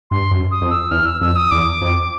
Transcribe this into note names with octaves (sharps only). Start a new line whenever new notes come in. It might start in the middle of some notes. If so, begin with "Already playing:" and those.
G2 C6
F#2
D#6
F2
E6
E2 F6
E6
F2 E6
D#6
E2 D6
F2